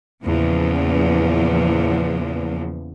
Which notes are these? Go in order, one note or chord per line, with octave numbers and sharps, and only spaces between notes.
E2 A#2 C#3 F3